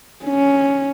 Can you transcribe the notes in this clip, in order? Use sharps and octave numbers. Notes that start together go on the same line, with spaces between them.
C#4